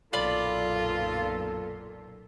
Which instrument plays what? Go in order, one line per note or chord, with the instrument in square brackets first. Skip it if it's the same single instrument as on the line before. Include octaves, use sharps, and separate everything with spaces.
[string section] B1 F#2 A#2 [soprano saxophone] F4 [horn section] A4 [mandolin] D5 B5 D6